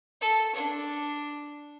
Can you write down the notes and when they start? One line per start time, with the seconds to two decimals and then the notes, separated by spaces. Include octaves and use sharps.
0.21 A4
0.55 D4